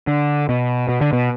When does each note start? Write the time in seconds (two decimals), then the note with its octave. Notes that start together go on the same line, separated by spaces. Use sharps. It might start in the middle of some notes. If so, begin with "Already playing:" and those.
0.07 D3
0.49 B2
0.89 B2
1.01 D3
1.13 B2